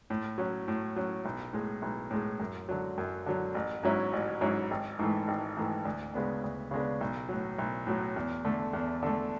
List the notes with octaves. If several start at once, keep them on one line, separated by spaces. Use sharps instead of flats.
A2
F#3 C#4
A2
F#3 C#4
B1
A2 G#3
B1
A2 G#3
F#2
D3 F#3
F#2
D3 F#3
A1
G#2 F#3 C#4 E4
A1
G#2 F#3 C#4 E4
G#1
G#2 E3 A3
G#1
G#2 E3 A3
D2
C#3 G#3 B3 D4
D2
C#3 G#3 B3 D4
B1
A2 F#3
B1
A2 F#3
E2
D3 A3
E2
D3 A3